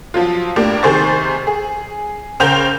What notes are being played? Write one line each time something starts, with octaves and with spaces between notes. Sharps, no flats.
F3 F#3 F4
A2 A#3 D4 G4
C3 D#3 G#4 C5 C#6 A6
G#4
C#3 A#4 C5 G5 G6 F7